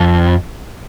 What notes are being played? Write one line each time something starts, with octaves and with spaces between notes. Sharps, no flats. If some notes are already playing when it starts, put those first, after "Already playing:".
Already playing: F2